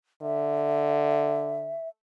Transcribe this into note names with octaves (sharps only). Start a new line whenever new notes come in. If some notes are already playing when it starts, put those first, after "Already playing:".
D3 E5